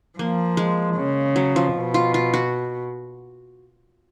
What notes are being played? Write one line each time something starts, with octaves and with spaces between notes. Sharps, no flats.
F3 A#3
G#3
C#3
F#3
F3
B2
F4
F4
F#4